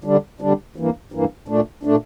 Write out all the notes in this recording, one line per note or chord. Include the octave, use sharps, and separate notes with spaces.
D3 G3 D4
D3 G3 D4
G2 E3 A#3
G2 E3 A#3
A#2 A3 D4
A#2 A3 D4